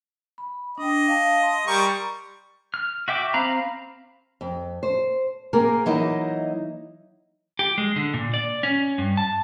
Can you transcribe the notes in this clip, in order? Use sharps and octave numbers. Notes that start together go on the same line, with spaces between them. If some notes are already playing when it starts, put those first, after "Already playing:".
B5
D4 D#5 G5
F5 A5
C6
G3 A#4 C#6
F6
F#4 E5 G5 D6
C4 F5 A#5 B5
F2
C5
A#3 C4 G#4 A#4
E3 F#3 A#3 D#4 E4 D#5
G4
G#3
D3
A#2
D5
C#4
G2
A5